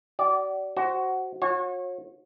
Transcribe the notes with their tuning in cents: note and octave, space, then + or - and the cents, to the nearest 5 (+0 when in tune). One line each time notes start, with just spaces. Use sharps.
F#4 +40 D5 -20
F#4 +15 C5 +5
F#4 -40 C#5 -30